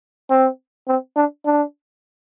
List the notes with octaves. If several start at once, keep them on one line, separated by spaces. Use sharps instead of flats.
C4
C4
D4
D4